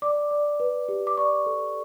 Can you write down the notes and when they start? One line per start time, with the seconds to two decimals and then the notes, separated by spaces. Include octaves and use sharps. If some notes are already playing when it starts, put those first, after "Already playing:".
0.02 D5 D6
0.31 D5
0.60 B4
0.89 G4
1.07 D6
1.17 D5 C#6
1.46 A4